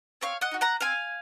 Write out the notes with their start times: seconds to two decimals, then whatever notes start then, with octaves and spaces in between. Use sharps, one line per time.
0.21 C4 C#5 F5
0.41 D#5 F#5
0.51 D#4 F#4
0.61 F#5 A#5
0.81 C4 F5 G#5